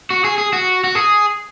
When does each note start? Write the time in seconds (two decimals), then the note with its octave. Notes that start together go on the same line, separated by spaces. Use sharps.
0.10 F#4
0.24 G#4
0.38 G#4
0.53 F#4
0.84 F#4
0.95 G#4